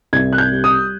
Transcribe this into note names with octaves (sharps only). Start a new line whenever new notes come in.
C2 G#6
F#6
G6
G3
D#6